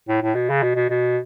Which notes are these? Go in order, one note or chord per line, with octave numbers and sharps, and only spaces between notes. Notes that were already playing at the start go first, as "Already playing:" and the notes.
A2
A2
B2
C#3
B2
B2
B2